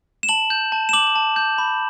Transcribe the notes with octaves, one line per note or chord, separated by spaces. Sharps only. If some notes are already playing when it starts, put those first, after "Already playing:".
E7
A5 F#7
G6
A5
E7
D6 F#7
A5
G6
B5